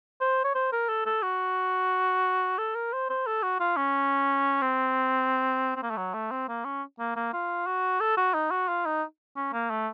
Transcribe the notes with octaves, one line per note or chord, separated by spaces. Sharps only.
C5
C#5
C5
A#4
A4
A4
F#4
A4
A#4
C5
C5
A4
F#4
F4
C#4
C4
C4
A#3
A3
F#3
A3
C4
A#3
C#4
A#3
A#3
F4
F#4
A4
F#4
D#4
F#4
F4
D#4
C#4
A#3
A3